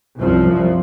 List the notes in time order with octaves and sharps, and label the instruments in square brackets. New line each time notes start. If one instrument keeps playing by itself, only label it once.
[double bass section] C2 F#2 F3